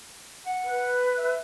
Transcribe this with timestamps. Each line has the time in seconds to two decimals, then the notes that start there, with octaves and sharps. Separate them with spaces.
0.46 F#5
0.64 B4
1.17 E5